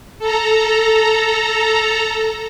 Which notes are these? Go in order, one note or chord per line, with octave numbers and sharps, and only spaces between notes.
A4 A#5